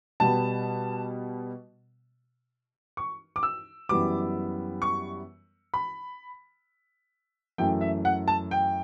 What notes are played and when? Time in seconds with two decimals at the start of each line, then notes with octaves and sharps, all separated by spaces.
0.20 B2 G3 B3 A5
2.97 C#6
3.36 D6
3.43 E6
3.89 F#2 E3 G3 B3 D6
4.82 C#6
5.74 B5
7.58 F#2 E3 A3 G5
7.81 E5
8.05 F#5
8.28 A5
8.51 G5